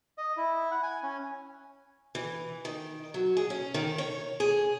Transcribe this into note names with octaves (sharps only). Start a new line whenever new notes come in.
D#5
E4
F#5
G#5
C#4
E3
D#3
F#3
G#4
C#4
D#3
C#5
G#4